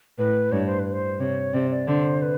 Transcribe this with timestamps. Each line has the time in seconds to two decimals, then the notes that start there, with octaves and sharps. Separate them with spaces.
0.18 A2 B4
0.52 G2 C#5
0.66 C5
0.79 B4
0.92 C5
1.20 C3 C#5
1.54 C3 D5
1.71 D5
1.87 D3 C5
2.22 B4